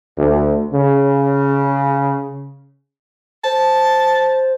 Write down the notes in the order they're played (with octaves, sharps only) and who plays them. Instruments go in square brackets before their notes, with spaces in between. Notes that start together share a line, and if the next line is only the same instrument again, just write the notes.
[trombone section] D2
C#3
[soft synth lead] C5 [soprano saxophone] A5